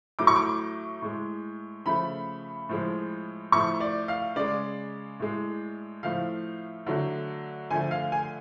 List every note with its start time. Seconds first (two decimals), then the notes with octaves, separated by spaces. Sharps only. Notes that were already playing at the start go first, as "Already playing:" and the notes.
0.19 A2 F#3 A3 D6
0.27 C#6
0.36 D6
1.02 A2 G#3
1.86 C#3 F3 A3 B5
2.69 A2 F3 G#3
3.52 A2 F3 A3 C#6
3.80 D5
4.08 F5
4.36 C#3 G#3 D5
5.20 A2 G#3
6.03 A2 F3 A3 F5
6.87 D3 F#3 A3
7.70 D3 F3 A3 G#5
7.91 F5
8.12 G#5